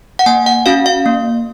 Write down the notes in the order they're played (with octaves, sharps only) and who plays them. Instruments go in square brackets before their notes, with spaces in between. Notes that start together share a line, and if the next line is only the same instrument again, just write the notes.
[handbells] F#5
A#3 G#5
F#5
C#4 F#4 F5
F5
A#3